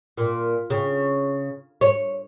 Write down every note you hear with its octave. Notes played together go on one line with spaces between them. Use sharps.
A#2
C#3
C#5